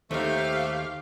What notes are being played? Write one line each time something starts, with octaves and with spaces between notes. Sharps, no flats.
D#2 A3 D#4 G4 C5 F5